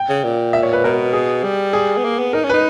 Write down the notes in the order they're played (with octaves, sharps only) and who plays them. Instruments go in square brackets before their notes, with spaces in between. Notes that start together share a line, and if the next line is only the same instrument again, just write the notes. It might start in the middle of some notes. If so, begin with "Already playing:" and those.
Already playing: [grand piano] G5
[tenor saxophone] C#3
A#2
[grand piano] E5
C#5
B4
[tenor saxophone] B2 [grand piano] A#4
[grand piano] G#4
[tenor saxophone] G3
[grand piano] G#4
[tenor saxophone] B3
A#3
B3
[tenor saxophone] D#4 [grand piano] A#4
[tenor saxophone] C#4
[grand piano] B4
[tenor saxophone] D#4